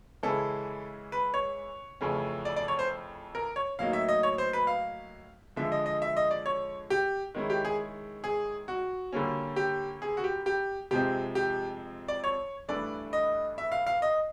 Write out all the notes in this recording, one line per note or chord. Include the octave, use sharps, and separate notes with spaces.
C#3 E3 G#3 C#4 E4 A4
B4
C#5
F2 C#3 E3 A3 C#4
D5
D5
C#5
C5
A#4
C#5
A2 F#3 A#3 D#4 F5
E5
D#5
C#5
C5
B4
F5
D3 F3 G#3 E5
D#5
D#5
E5
D#5
D5
C#5
G4
D#3 G#3 C#4 E4
G4
G#4
G#4
F#4
D3 G3 A#3 C#4
G4
G#4
F#4
G4
G4
F2 C3 F3 G#3 C4 G4
G4
D5
C#5
G2 E3 A3 D4 D5
D#5
E5
F5
F5
D#5